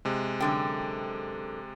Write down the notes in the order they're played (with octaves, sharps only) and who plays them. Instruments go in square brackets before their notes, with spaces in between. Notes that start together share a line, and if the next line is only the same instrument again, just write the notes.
[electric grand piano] C3 G#3
[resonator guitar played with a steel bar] F#2 D3 G5